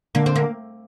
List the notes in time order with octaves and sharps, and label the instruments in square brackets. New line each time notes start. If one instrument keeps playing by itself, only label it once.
[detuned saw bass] D3 [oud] A#3
[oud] C4
A#3